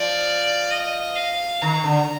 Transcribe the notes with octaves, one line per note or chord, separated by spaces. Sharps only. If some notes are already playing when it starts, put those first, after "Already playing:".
Already playing: F3 D5
D#5
F5
D#3 A#5
D3